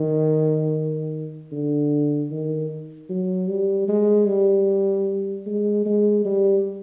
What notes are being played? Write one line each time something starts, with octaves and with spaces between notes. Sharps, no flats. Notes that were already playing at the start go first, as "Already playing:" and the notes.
Already playing: D#3
D3
D#3
F#3
G3
G#3
G3
G#3
G#3
G3